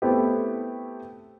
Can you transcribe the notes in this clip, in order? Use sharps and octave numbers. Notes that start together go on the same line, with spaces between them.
A3 B3 C4 E4 G4